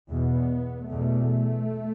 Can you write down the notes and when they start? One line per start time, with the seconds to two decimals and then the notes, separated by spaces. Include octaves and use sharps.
0.10 E2 B2 B3
0.89 E2 B2 A3